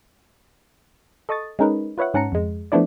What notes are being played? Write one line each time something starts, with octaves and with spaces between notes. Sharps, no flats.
A4 D#5 C#6 D#6 A6
G#3 C#4 D#4 A#4 B4
F4 B4 C#5 E5 F#5
G#2 C#4 F#5 A5 A#5 C#7
F2 G#3
F3 A3 B3 D4 E4 D5